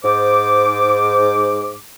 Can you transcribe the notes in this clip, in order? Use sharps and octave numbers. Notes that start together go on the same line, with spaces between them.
G#2 C5 D6